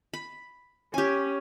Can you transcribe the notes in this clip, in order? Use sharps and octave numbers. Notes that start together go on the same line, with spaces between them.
B5
C#4 G4 G#5